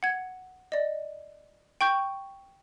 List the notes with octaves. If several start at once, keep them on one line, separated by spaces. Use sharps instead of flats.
F#5 G#6
D5 D#5
G5 C#6 G6